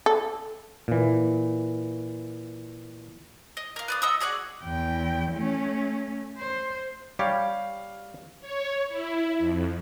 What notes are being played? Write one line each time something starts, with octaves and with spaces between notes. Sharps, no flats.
A4
A#2 E3
D#5
A#4 F5
B4 D5 D#6
D#5 F#5 D#6 E6
F#4 G#4 D5 F#5
E2 G5
A3 C#4
C5
G3 G4 C#5 F5
C#5
E4
F2